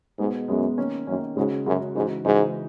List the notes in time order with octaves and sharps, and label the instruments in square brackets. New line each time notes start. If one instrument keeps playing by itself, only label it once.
[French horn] G#2 [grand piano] B2 G#3 B3
[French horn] F#2 [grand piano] B2 G#3 B3
[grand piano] D#3 A#3 C#4
[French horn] F#2 [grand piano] D#3 A#3 C#4
[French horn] G#2 [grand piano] C#3 G#3 C#4 F#4
[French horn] F#2 [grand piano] C#3 G#3 C#4 F#4
[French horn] G#2 [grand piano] C#3 E3 G#3 D#4 F#4
[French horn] G#2 [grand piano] C#3 E3 G#3 D#4 F#4